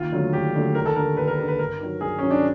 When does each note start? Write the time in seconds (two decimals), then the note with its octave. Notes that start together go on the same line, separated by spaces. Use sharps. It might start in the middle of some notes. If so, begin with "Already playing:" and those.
Already playing: D#2 F4
0.12 D3 F#3 A3
0.33 D#2 G4
0.54 D3 F#3 A3
0.75 D#2 A#4
0.86 A4
0.96 D3 G3 A#4
1.17 D#2 B4
1.28 A#4
1.38 D3 G3 B4
1.48 B4
1.59 G2 A#4
1.80 D#3 F#3
2.01 G2 G#4
2.19 D#3 F#3 C#4
2.31 D4